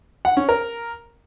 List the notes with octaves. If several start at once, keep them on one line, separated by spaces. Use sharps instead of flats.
F#5
C#4
A#4